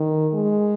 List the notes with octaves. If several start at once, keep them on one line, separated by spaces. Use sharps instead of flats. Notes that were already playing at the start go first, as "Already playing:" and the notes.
Already playing: D#3
G#3